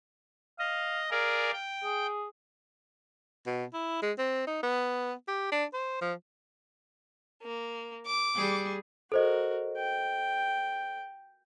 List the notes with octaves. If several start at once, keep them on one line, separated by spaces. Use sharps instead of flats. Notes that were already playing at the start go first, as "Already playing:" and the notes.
D#5 F5
G#4 A#4 D5 F5
G5
G#4
B2
E4
G#3
C4
D#4
B3
G4
D4
C5
F3
A#3
D6
G3 G#4
F#4 A4 A#4 C5 D#5
G5